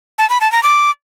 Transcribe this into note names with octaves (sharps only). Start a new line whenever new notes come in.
A5
B5
A5
A#5
D6